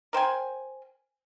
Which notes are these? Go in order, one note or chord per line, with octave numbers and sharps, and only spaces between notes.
A#4 C5 G5 G#5